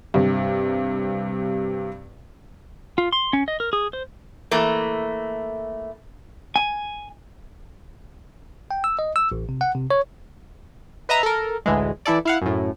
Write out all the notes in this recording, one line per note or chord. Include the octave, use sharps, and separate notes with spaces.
G2 C3
F4
C6
C#4
D#5
A#4
G#4
C5
E3 A3 A#3
G#5
G5
E6
D#5
E6
A1
C3
F#5
C3
C#5
B4 D#5 E5 A#5
A4 A#4
A1 D2 E3 G#3
E3 E4 A4 D5
E4 F5 F#5
F#2 A2